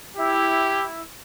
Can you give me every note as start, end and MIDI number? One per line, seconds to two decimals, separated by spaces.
0.16 1.01 64
0.16 0.85 67